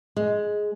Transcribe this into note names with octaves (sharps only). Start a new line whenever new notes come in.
G#3